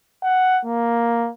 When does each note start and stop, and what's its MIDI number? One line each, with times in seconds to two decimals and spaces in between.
0.23 0.60 78
0.65 1.30 58